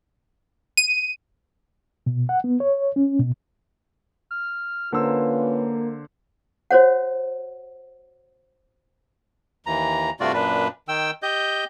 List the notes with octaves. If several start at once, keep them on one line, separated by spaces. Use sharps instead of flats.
D#7
B2
F#5
B3
C#5
C#4
B2
F6
D3 A#3 C#4 F4 B4 C5 E6
F#4 C5 C#5 F#5
D#2 E3 A#5
G2 C3 A3 F4 F#4 D5
F#2 A#2 D4 B4
D#3 G5 E6
G4 D#5 G6